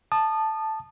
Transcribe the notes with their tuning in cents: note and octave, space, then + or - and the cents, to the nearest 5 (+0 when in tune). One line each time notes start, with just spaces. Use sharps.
A5 +0 D#6 -30